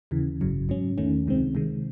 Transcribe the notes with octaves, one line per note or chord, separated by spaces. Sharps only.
D#2 C#3 E3
G#1 F#2 C#3 F#3
G#2 F#3 C#4
E2 D#3 A3 C#4
C#2 C3 D#3 G#3 C4
C3 D#3 G#3